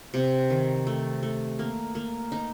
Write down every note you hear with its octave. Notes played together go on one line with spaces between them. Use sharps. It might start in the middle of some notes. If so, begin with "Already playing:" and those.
C3
D#3
A3
A3
A#3
A#3
D#4